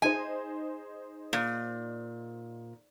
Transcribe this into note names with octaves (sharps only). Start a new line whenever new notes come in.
D#4 G#4 C5 G#5
A#2